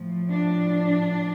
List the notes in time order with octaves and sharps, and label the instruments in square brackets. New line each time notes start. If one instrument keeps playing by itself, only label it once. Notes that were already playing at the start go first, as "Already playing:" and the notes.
Already playing: [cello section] A2 F3
D4